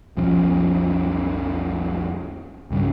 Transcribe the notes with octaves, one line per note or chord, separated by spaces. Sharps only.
B1 F2 F3 C#4
C2 G2 C#3